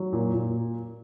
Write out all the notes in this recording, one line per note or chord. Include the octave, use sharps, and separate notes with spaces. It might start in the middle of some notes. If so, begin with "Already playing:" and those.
Already playing: F#3
A#2
A#2